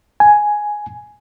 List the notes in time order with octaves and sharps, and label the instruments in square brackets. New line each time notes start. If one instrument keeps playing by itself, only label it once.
[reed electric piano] G#5